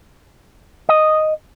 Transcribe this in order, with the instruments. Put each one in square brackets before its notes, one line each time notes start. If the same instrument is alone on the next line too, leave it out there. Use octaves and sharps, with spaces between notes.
[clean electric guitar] D#5